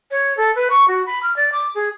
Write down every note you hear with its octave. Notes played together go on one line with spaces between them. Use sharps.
C#5
A4
B4
C#6
F#4
B5
F6
D5
D6
G#4